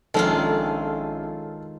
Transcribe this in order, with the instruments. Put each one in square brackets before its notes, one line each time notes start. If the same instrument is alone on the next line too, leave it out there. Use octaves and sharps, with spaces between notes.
[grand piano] A#1 C#4 D4 [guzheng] D#3 G#3 F4 [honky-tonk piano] A4